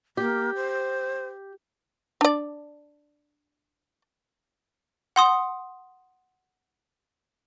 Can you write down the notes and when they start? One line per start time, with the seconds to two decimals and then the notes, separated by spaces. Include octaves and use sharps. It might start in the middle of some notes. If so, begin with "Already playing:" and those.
0.17 A#3 G4
0.55 C5
2.21 D4 D5
5.16 F#5 C6 D#6